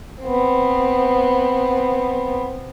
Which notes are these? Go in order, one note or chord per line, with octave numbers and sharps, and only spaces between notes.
B3 C4